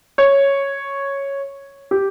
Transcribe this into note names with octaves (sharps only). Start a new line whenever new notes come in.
C#5
G4